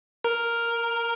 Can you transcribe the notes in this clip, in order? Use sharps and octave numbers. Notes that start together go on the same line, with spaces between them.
A#4